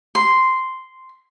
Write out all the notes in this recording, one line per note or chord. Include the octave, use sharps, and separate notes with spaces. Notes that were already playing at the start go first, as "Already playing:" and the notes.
C6